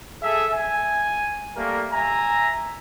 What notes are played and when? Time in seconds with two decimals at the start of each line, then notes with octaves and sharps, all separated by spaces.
0.23 G#4 A4 E5
0.54 G#5
1.57 G3 A3 A#3 A#4
1.92 E5 G#5 A#5